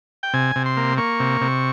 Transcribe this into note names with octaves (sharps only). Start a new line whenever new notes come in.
G5
C3 G#5
C3
C6
A#3
A#3 C#6
C3
C3